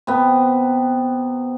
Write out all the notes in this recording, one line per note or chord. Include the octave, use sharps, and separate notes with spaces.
C3 B3